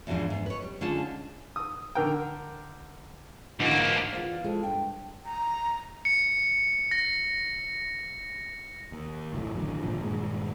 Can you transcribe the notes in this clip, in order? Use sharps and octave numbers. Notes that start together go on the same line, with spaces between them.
E2 G#2 B2 F3 G#3 D4
G#2 B3
B4 C#5
G3
D3 G#3 C#4 D#4 F4 A5
D#6
D3 A#4 G5
G#2 D3 E3 A#3 F#4
E2 C#3 F4 D5
F2 G#3 F4 G#4 A4
G2 D4 G5
A#5
C#7
A#6
D#2
F#1 B1 A2
A1 D#2 D3 F#3
G#1 A#2 D3 F3
G2 A#2 D#3 G#3